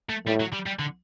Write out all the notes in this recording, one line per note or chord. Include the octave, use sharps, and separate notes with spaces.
A3
A2 G3
F#3
G3
G3
D3